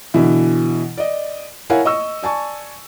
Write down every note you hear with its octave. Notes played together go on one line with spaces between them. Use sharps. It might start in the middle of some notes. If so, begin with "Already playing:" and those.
B2 D3 E3 E4
D5 D#5
E4 A#4 C#5 F5 F#5 G#5
D#5 C#6 E6
D5 G#5 A5 C#6